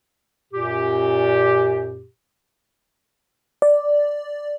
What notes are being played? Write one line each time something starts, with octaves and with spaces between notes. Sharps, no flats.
F#2 A#2 G4
D5